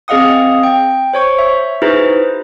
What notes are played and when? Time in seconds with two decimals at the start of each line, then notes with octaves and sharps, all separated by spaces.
0.08 C4 G#4 D#5 F5 F#5 D#6
0.63 G5
1.14 C5 C#5 C#6
1.39 E5
1.82 D#4 E4 F#4 G#4 B4 C5